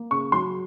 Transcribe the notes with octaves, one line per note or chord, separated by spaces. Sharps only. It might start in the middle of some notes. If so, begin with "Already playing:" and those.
Already playing: A#3
C#3 C#6
F#3 C6